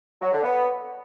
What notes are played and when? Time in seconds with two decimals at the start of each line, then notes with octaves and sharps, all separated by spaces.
0.21 F#3
0.32 D3
0.43 B3